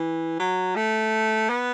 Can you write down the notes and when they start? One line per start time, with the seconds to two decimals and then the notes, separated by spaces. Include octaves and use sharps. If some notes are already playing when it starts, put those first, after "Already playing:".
Already playing: E3
0.40 F#3
0.76 A3
1.49 B3